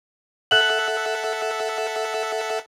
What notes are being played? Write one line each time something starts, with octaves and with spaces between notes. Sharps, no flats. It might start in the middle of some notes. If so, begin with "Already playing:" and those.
A4 E5 F#5 F#6 F#7